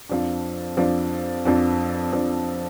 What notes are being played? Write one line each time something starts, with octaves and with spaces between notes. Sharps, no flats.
F2 F3 D4
F2 F3 D4
F2 F3 D4
F2 F3 D4